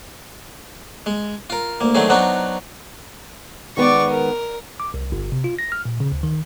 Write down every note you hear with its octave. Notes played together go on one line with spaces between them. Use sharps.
G#3
F4 A#4
D2 A#3
D3 D#3 F#3 A3 C4 G#4
F#3 B3 C4 D4 D#4 F#4
D#3 G#3 B3 D5 C#6
A#4
D6
C2
G1
C3
F4
A#6
F6
A#2
C#3
D2
D#3